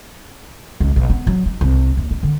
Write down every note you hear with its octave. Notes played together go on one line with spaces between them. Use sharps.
C#2
B1
B3
F#3
D#4
C2
D#2
D#4
D3